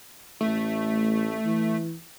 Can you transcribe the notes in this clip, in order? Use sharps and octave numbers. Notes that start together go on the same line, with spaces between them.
A1 A3
E3